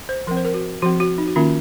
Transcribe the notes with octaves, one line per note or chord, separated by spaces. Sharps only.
C5
F3 C4 A#4
C5
A#4
F#4
F3 C4 F#4
F#4
D#4
F#4
D#3 A#3 C#4 F4